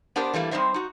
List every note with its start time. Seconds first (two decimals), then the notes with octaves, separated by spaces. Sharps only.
0.16 B3 D4 G4 A#4 C5
0.34 E3 G3 A3 A#3
0.51 G3 C4 D#4 C5 E5
0.74 D#4 F#4